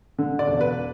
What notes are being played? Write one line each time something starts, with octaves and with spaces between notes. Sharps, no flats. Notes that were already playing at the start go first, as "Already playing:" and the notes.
D3
D5
E1
B4